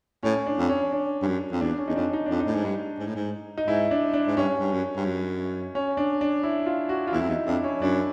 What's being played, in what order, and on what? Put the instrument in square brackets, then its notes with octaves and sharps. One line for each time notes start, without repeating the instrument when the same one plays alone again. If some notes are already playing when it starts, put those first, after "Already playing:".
[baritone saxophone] A2 [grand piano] C#4
[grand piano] D4
[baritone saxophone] F2
[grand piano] C#4
D4
[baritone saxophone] G2
F#2
F2
[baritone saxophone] E2 [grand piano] D4
[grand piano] C#4
[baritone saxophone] E2 [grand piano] D#4
[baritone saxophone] F2 [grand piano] D4
[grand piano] D#4
[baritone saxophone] F2 [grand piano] D4
[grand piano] D#4
[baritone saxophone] A2
G#2
G2
G#2
A2
G#2
[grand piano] D#4
[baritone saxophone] G#2 [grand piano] E4
[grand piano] D4
D4
[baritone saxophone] G#2
[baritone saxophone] G2 [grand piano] C#4
[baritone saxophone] G2
F#2
G2
F#2
[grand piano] C#4
D4
D4
E4
F4
F#4
F4
[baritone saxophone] E2 [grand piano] E4
[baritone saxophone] F2
[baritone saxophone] E2 [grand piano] D#4
[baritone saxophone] F2 [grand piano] D4
[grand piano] C#4
[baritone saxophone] F#2 [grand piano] D4